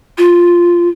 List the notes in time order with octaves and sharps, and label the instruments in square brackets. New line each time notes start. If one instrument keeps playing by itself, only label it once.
[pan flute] F4